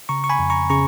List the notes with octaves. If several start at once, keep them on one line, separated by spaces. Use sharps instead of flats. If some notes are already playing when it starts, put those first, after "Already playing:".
C#3 A#5 C#6
C#6
G#5 B5
F2
A#5 C#6
C#3 A#5 C#6